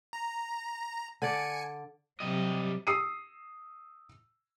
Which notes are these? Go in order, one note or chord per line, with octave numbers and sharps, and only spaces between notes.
A#5
D3 D5 G#5 C#7
C3 F#3 G3 D#5
D#6 E6 C7 C#7 D#7